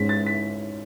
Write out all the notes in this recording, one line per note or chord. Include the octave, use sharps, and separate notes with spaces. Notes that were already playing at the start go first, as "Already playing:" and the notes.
Already playing: G#2 G#3 C#4 B6
A6
B6